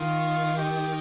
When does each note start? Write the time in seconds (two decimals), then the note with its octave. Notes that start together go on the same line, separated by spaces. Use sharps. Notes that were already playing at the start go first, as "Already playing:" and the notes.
Already playing: D#3 F4
0.57 G4